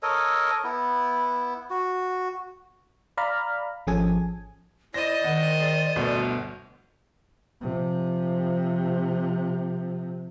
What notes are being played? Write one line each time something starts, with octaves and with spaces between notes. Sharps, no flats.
A4 A#4 C#5 D#5
B3 E4
F#4
D5 F5 A#5 B5 F6
G#1 F3 C#4 G#4 A4 G#5
E4 C5 D5 D#5 A#6
D#3 F#5
G#4
G1 D2 B2
C3 F3